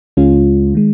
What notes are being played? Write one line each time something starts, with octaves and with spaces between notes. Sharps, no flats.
C#2 C#3 G#3 C#4 F4
D#3 G#3